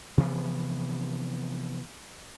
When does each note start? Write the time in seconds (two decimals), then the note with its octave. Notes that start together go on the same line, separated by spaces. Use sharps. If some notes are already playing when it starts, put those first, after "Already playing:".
0.17 C3 E3 F3 B3